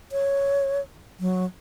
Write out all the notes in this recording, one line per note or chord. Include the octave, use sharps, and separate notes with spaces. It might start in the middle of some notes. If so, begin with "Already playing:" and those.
C#5
F#3